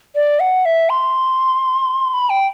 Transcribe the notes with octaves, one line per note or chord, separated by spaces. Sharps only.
D5
F#5
E5
C6
B5
G5